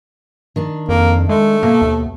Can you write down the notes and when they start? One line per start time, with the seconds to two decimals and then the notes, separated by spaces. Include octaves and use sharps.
0.56 D#3 D4
0.89 F2 A#3
1.29 G#3 A3
1.63 B2 A#3
1.82 D#2